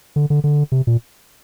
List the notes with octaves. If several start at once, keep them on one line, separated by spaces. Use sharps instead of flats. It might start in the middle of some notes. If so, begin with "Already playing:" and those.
D3
D3
D3
C3
A#2